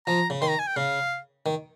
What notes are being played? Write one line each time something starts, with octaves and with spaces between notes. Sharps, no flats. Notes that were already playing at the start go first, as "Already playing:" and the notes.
F3 A#5
C#3
D#3 C6
A#5
G#5
G5
C#3 F5
D#3